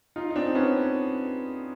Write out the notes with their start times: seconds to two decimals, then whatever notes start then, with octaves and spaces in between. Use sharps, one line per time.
0.16 D#4 F4
0.30 D#4
0.36 C4 D4
0.46 C4
0.55 B3 C#4